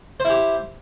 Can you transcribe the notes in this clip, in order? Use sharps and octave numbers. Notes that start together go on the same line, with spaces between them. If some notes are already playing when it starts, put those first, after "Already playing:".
E4 G4 C5